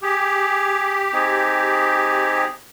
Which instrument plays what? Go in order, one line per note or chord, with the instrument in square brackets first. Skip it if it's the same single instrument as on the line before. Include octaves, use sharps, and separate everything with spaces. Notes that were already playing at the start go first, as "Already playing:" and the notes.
[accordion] G4 [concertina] G#4
[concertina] C4 D#4 G#4